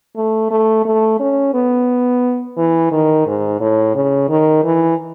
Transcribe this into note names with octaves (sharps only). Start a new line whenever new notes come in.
A3
A3
A3
C#4
B3
E3
D#3
G#2
A2
C#3
D#3
E3